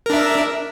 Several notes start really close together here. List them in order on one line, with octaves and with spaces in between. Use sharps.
A#4 D4 E5